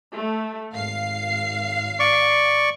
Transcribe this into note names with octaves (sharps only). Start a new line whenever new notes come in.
A3
G#1 F5 C7
D5 C#6